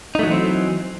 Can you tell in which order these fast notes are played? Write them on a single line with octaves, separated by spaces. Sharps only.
D#4 A3 F#3 E3 C4